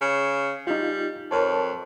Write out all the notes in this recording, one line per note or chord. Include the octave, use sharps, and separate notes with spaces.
C#3
G3 D#4 F4
F2 A#4 C#5 A5